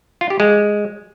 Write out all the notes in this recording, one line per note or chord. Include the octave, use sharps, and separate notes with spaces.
F4
G4
G#3